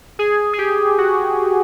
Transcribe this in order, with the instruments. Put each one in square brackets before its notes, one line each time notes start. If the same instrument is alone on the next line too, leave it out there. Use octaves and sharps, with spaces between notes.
[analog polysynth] G#4
G#4
G4
F#4